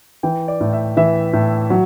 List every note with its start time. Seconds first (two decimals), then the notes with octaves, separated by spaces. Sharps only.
0.23 E3 G5
0.48 D5
0.60 A2
0.73 E5
0.97 E3 E5
1.33 A2
1.70 F#3